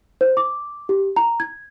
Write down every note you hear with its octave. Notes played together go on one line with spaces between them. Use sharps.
C5
D6
G4
A#5
G#6